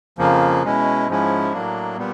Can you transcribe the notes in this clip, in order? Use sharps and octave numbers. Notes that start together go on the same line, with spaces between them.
F2 C#3 F3 A#3
B2 G#3 C#4 E4
G#2 F3 G#3 C#4 E4
A2 F#3 A#3 D4
A#2 G3 B3